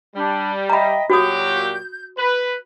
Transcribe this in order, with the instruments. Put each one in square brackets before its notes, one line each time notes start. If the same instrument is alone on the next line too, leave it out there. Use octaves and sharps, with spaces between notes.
[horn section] G3 [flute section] D4
[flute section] D#5 E5 G5 [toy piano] A#5 B5
[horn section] A#2 F#3 G4 [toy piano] F#4 D#6 [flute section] G6
[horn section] B4